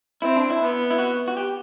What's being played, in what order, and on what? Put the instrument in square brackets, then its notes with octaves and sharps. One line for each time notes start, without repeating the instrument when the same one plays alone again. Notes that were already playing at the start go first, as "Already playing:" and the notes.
[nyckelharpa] C4 [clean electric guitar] E4
[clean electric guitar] D4
E4
[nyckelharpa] B3
[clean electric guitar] E4
F#4
F#4
G4